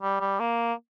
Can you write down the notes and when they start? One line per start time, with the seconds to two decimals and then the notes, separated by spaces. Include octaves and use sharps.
0.02 G3
0.20 G3
0.39 A#3